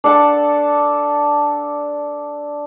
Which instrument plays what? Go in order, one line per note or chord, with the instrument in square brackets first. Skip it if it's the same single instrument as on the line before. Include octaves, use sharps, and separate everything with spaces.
[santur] D4 A4 F#5 A5